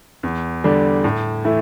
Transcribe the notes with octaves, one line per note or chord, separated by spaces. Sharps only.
E2
D3 G3 D4
A2
E3 A3 E4